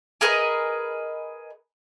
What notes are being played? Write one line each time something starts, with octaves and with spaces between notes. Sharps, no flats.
G#4 A#4 B4 D#5